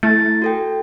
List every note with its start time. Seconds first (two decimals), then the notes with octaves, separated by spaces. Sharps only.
0.03 A3 E4 A6
0.42 F#4 A4 G5